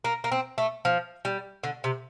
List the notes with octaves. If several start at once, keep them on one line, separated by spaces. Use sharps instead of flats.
A#3
A#3
C4
A3
F3
G3
D3
C3